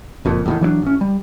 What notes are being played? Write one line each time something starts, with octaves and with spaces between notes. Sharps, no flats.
F#1 F2 A#2
E2 A2 D#3
E3 F#3 G#3 D4
A1 C#4
G3